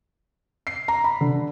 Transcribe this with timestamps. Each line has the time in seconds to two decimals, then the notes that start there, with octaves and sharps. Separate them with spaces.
0.67 C7
0.88 A#5
1.04 B5
1.21 D3